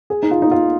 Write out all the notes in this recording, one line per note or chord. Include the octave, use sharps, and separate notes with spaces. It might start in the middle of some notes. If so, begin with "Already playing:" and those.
G#4
D#4
F4
D#4
F4